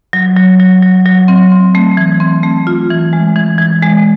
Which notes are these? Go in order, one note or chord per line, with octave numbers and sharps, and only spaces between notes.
F#3
F#3
F#3
F#3
F#3
C4
C4
A3
E3
C4
A3
F4
E3
G#3
E3
E3
G#3